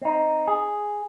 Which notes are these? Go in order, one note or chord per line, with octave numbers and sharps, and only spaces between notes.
C4 D#4
G#4